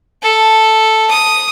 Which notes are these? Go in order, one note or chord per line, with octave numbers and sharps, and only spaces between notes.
A4
D#6